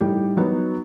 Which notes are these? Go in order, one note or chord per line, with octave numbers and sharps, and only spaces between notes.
A2 G3 D#4 G4
F#3 B3 D#4 F#4